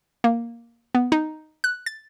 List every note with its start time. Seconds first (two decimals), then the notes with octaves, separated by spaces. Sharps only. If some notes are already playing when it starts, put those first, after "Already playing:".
0.24 A#3
0.95 B3
1.12 D#4
1.64 F#6
1.86 A6